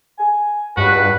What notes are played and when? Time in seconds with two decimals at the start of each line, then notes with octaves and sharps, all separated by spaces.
0.18 G#5
0.77 C#2 G2 F#4 B4